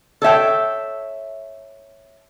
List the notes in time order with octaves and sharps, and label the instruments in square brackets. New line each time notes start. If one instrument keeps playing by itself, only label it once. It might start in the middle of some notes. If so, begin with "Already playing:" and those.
[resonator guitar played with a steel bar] A4 C#5 E5 G5